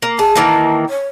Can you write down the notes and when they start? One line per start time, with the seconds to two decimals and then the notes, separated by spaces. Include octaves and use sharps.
0.02 A#3
0.19 G#4 A5
0.36 D#3 E3 A#3
0.89 C#5